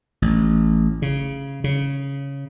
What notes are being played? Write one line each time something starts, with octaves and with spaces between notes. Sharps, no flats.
A1
C#3
C#3